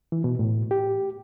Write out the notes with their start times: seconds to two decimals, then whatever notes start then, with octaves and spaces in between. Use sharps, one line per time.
0.12 E3
0.24 B2
0.39 A2
0.71 G4